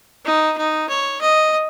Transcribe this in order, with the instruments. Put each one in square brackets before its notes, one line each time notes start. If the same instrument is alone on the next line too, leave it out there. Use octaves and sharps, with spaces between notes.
[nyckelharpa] D#4
D#4
C#5
D#5